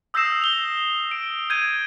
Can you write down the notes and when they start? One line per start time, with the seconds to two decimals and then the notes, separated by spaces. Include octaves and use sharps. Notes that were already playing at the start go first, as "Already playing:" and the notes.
0.14 D#6 E6 G6 A#6 C7 E7
0.42 F7 G7
1.11 D7
1.50 G6 G#6 D#7